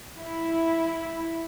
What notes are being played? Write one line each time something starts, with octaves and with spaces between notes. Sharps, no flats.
E4